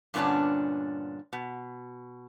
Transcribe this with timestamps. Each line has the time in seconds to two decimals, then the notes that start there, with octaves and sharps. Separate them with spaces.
0.14 G2 A#2 D3 B3 C#4 D4
1.33 B2